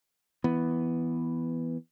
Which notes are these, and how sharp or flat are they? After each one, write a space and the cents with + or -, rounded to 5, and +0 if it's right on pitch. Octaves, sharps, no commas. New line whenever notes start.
E3 +0 B3 +0